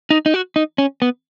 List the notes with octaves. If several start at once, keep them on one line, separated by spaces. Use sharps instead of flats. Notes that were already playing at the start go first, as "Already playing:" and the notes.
D#4
D#4
F#4
D#4
C#4
B3